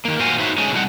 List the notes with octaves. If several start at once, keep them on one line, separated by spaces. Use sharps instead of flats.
D#3 A#3
A#2 F#4 C5 F5 G#5
D#4 F#4 C5 C#5 E5
G#3 A3 C#4 G#4 C#5 G#5
C3 F3 G3 D#4 F#5